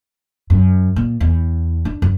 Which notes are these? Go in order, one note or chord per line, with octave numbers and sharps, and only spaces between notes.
F#2
A#2
E2
D4
F#2